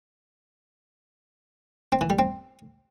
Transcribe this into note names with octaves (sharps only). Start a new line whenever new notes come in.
C4
E3
G3
C4